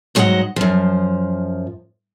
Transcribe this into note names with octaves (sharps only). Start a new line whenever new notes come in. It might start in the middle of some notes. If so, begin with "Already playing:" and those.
G#2 F#3 G4 A#4 D#5 F#5
F#2 F3